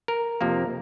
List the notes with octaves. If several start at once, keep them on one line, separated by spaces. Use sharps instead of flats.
A#4
F2 C3 F3 A#3